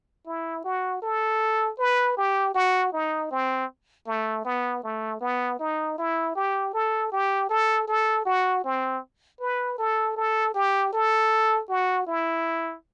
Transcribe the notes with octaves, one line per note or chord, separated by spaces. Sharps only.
E4
F#4
A4
B4
G4
F#4
D#4
C4
A3
B3
A3
B3
D#4
E4
G4
A4
G4
A4
A4
F#4
C4
B4
A4
A4
G4
A4
F#4
E4